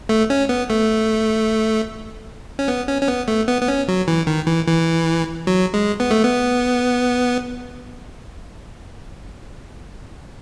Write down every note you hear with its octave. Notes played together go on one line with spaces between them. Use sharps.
A3
C#4
B3
A3
C#4
B3
C#4
C#4
B3
A3
B3
B3
C#4
F#3
E3
D#3
E3
E3
F#3
G#3
B3
A3
B3